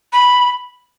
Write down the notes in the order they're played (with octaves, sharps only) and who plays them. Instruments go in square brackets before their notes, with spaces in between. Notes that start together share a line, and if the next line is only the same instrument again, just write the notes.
[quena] B5